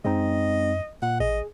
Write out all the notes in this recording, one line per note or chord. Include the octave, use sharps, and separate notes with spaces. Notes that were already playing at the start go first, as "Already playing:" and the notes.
F#2 G#3 C4 D#4 D#5
A#2 F#5
A1 G#4 D#5